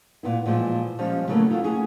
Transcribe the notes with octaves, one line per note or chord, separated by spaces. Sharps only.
A#2 B3 E4
A#2 E3 F3 G#3
F3 G3 G#3 C#4
C#3 E3 F#3 A3 A#3 C#4
F#3 A3 B3 E4 F4
C#4 F#4 G#4